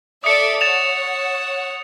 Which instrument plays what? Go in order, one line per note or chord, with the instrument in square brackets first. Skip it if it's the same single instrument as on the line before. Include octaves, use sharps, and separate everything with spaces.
[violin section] A4 D5 E5 [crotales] D#6 C#7
[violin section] C#5 F#5 [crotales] A6 E7 F7